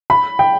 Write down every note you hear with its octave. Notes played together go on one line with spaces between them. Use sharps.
B5
G5